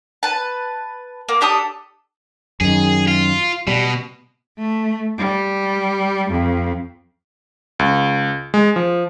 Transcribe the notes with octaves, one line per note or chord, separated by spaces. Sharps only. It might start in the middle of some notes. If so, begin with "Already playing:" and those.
B4 A5
A#3
D4 G4 A4 D#6
F#2 D#3 G#4
F4
B2 G3
A3
G3
F2
C#2
G#3
F3